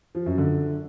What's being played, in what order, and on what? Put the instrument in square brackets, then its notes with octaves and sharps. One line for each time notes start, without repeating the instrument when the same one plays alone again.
[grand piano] F3
F#2
D3